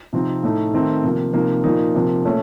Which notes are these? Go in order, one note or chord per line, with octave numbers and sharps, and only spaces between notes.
C3 F3 C4 D#4
A2 A3 D#4
D#3 A3 C4 D#4
C3 F3 A#3
C3 F3 A#3 D#4
A#2 F3 A#3 D#4
C3 F3 A#3
A#2 A3 C#4